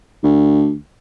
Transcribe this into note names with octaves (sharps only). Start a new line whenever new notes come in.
D2